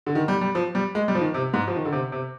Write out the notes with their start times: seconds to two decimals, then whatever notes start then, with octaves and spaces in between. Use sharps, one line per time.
0.06 D3
0.15 D#3
0.28 G3
0.41 G3
0.55 F3
0.75 G3
0.95 G#3
1.08 G3
1.15 F3
1.21 D#3
1.34 C3
1.53 G#2
1.67 F3
1.76 D#3
1.85 D3
1.92 C3
2.12 C3